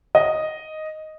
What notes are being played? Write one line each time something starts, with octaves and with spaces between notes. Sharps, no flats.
D#5